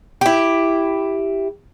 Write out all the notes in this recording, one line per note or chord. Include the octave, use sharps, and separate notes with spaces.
E4 G4